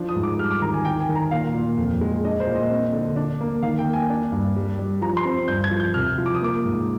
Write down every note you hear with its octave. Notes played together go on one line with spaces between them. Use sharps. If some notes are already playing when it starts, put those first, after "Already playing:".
Already playing: F3 D4
D#6
G#2
D6
G3 F6
D6
D#3 A#5
G#5
D#3 G5
G#5
D#3
A#5
A#2 F5
A#2
F2
G#3
D4 D#5
C5
A#2
D#5
C4
D3
D4
A#3
D#3 F5
G5
A#3
G#5
D4
G2
G3
G3
F3 A#5
C6
C4
G2 G6
G#6
F3
G6
C3 F6
F3
D6
D#6
A#3 D6
G#2